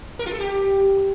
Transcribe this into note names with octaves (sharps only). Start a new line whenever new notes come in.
A#4
F4
A4
G4